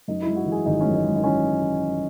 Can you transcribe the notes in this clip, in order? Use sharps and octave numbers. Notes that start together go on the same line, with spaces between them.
F#2 D#4
G#3 E4
F#4
E3
G#4
G#1 D#4
F#2 C#4
D#4
G#3
D#4
E3 C#4